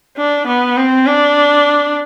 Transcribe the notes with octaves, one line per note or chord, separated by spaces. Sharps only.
D4
B3
C4
D4